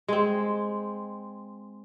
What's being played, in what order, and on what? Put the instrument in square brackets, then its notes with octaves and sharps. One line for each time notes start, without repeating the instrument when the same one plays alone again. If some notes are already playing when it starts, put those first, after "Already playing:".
[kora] G#3 C4